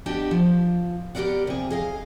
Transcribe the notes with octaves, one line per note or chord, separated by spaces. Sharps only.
B3 D4 G4 D#5
F3
B3 G4 G#4 A#4 D5 F#5
C3 G#4
G#4 D#5 F5